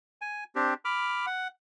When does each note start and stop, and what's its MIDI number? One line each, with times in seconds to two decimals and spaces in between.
0.21 0.44 80
0.55 0.74 60
0.55 0.74 62
0.55 0.74 67
0.85 1.26 83
0.85 1.26 86
0.85 1.26 89
1.26 1.48 78